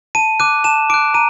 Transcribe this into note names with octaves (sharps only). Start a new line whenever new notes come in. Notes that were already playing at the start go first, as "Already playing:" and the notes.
A5 D#7
D6 F#6 D#7
A5 E7
D6 F#6 D7
A#5 D#7